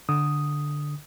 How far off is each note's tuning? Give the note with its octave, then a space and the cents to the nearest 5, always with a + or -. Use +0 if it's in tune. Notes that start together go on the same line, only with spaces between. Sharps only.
D3 +0 D#6 +0